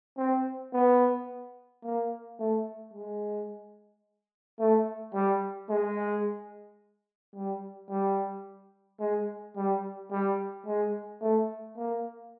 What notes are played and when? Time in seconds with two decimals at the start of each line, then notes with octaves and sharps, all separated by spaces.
0.18 C4
0.73 B3
1.84 A#3
2.39 A3
2.94 G#3
4.60 A3
5.14 G3
5.70 G#3
7.35 G3
7.90 G3
9.00 G#3
9.56 G3
10.11 G3
10.67 G#3
11.21 A3
11.77 A#3